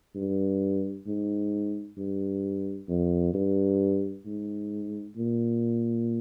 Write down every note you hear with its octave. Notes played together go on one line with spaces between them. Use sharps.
G2
G#2
G2
F2
G2
G#2
A#2